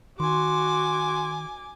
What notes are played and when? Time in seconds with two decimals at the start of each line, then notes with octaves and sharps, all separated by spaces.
0.20 D#3 F#4 G#5 C6 D6